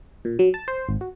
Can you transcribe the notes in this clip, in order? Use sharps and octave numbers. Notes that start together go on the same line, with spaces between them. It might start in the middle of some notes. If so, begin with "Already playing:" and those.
A#2
F#3
A5
C5
G#1
F#4